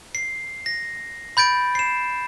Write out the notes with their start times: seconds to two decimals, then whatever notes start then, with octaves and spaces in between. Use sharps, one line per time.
0.15 C7
0.66 A#6
1.37 B5 G6 A6 D7
1.75 C7 E7